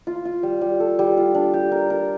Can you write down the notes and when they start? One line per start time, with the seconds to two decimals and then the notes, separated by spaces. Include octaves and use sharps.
0.07 F4
0.25 F4
0.43 G3
0.61 G3
0.80 A4
0.99 G3
1.17 F4
1.34 D4
1.54 G4
1.72 A#4
1.90 A#4